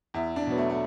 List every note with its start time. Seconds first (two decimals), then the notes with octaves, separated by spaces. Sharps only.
0.14 E2 E4
0.36 D4
0.47 B2 F#3 B3
0.58 A3
0.70 A3